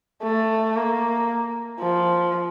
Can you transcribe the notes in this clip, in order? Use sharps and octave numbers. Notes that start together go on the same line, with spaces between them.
A3
A#3
F3